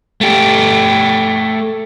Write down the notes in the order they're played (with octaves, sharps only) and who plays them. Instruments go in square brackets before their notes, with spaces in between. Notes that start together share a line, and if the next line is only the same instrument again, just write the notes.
[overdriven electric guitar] A3 G4